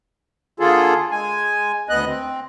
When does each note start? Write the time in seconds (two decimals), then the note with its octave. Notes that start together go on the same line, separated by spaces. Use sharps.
0.60 D3 A#3 F4 G#4 A4
1.11 G#3 G#5
1.89 D2 B3 D#5 F#6
2.06 C4